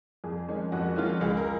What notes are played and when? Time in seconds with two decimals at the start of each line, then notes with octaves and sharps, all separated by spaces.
0.24 F2 G#4
0.48 D#3 G#3 C#4
0.72 F2 F#4
0.96 D#3 G#3 C#4 F4
1.04 F#4
1.21 C#2 G#4
1.37 A#4